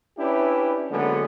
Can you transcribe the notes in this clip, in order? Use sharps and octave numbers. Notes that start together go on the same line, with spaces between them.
C#4 D4 E4 G4 B4
D3 F#3 G#3 A#3 B3